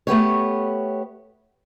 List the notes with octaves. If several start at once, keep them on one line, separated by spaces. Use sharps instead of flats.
A3 B3 G4 C#5